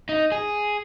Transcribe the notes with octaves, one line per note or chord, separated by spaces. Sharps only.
D#4
G#4